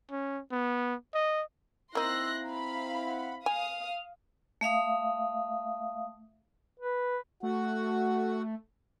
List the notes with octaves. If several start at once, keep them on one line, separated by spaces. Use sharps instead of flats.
C#4
B3
D#5
A#3 C4 D#4 E4 C6 E6 F#6 A#6
F5 A#5 B5
F#5
F5 G#5 D#6 F7
A3 E5 F5 D#6
B4
A3 F#4 F#5